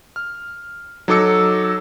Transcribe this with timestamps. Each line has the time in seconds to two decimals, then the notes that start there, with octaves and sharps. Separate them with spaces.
0.16 F6
1.08 F#3 D#4 A4 D6 E6 C#7